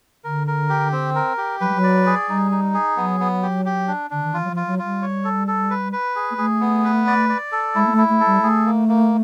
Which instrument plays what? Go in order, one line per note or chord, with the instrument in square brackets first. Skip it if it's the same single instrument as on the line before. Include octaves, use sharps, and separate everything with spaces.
[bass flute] D3 [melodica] A#4
[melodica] A#4
G4
C4
A#4
G4
[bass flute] F#3 [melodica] B4
[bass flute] G3
F#3
[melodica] D5
G#4
[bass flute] G3 [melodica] D#4
[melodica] D#4
G#4
[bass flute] F#3 [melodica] B3
[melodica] B3
G4
G4
D4
[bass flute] D3 [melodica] D4
[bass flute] D#3
[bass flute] E3 [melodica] F4
[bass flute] F#3
F3
[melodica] F4
[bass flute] F#3
[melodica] F4
[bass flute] G3
[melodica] C#5
A4
A4
B4
B4
G#4
[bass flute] A#3
[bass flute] A3 [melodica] G#4
[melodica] B3
B4
D5
D5
A4
[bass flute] G#3 [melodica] E4
[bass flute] A#3
A3
[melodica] E4
[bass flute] A3
[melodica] A4
[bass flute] G3
[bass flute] A3 [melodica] G#4
[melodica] A#3
A#3